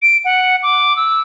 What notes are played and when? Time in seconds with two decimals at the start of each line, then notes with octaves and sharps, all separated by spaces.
0.02 D7
0.25 F#5
0.63 D6
0.97 E6